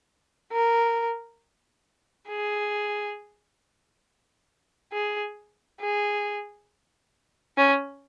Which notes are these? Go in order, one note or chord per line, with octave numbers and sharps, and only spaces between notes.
A#4
G#4
G#4
G#4
C#4